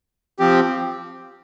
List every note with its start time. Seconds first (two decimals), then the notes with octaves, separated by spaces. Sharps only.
0.39 F3 C4 G4